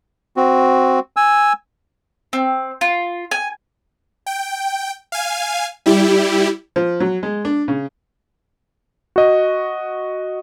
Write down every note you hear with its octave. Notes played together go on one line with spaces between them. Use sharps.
C4 F#4
G#5 E6
C4
F4
G#5
G5
F5 G#5
G3 E4 G4
F3
F#3
G#3
D4
C#3
F#4 D#5